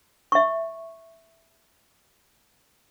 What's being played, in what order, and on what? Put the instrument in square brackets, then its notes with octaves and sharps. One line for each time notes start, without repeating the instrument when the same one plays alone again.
[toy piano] E5 C#6